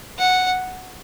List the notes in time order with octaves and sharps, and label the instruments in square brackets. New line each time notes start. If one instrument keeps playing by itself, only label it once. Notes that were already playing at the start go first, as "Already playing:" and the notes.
[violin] F#5